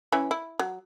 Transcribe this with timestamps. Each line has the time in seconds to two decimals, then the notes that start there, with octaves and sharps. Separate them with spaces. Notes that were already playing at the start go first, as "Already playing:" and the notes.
0.12 E3 C#4 E4
0.31 E4
0.59 F#3